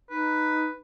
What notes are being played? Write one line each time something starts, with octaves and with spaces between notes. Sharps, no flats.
D#4 B4